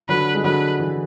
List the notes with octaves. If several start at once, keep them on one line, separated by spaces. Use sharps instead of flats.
D3 F#3 B4
G#3
D3 F#3 B4
E3